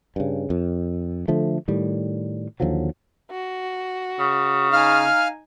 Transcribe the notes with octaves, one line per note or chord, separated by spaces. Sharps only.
G2 C#3
F2
D3 F3 A3
A2 D#3 G3
D#2 D3 F3 F#3
F#4
C#3
D#4 F5 G#5 F6